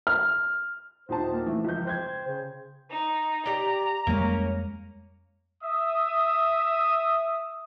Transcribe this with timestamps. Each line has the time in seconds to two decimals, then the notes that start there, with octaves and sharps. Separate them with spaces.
0.07 F6
1.09 D#1 D#4 C5 A5
1.33 A#3
1.46 E3 A3
1.64 C#2 F3 G6
1.85 C5 G5 G6 G#6
2.27 C#3
2.89 D#4
3.46 G4 D5 A#5
4.07 F2 G3 G#3 A#3 C#4
5.64 E5 D#6